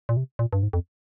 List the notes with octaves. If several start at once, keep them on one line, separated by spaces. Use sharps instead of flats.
A#2
C3
A#2
G2
G#2
F2